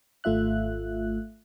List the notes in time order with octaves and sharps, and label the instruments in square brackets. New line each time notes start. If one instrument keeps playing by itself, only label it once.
[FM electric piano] G#1 A3 F4 E5 F#6